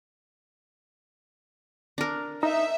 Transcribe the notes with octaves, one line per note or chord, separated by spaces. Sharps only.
D4 A#4
D#4 E5